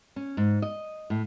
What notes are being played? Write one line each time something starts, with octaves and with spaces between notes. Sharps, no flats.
C#4
G#2
D#5
A2